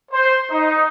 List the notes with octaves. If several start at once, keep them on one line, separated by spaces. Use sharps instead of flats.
C5
D#4